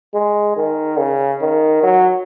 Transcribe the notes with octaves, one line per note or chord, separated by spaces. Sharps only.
G#3
D#3
C#3
D#3
F#3